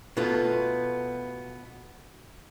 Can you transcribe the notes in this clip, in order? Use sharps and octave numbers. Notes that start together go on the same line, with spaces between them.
B2 A3 B3 F4